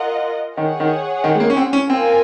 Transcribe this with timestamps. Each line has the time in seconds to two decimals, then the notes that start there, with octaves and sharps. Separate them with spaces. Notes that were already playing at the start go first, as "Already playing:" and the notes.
Already playing: F4 A#4 D#5 F#5
0.57 D#3 G#4 C#5 F#5
0.80 D#3
1.24 D#3
1.35 G#3
1.40 A#3
1.50 C#4
1.57 C4
1.73 C#4
1.90 A#3 C4 F4 A#4 F5 G#5